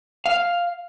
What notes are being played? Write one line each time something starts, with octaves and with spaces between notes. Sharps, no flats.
F5